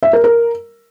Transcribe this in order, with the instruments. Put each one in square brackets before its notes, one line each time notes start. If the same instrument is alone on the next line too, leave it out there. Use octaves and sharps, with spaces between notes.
[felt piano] E5
A#4
A#4